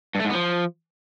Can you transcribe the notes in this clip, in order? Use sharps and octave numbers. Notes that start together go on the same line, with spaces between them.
G2
A3
G#2
B3
F3